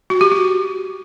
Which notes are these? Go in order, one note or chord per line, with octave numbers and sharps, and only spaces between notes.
F#4
G4
F#4